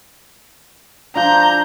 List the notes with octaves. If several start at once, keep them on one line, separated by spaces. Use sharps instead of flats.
F3 D4 A#5 G6